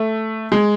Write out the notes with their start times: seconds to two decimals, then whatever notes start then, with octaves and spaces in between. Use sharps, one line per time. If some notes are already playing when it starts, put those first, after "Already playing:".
Already playing: A3
0.52 G#3